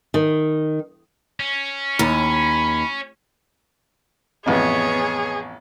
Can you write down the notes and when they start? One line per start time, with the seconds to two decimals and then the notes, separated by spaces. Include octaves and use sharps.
0.14 D#3
1.40 C#4
1.99 D#2 B5
4.46 A1 F2 B3 G#4 B4 C#5 D#5